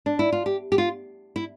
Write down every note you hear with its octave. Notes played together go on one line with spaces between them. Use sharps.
D4
E4
F4
G4
G4
F4
E4